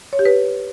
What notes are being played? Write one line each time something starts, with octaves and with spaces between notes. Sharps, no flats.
C#5
G4
B4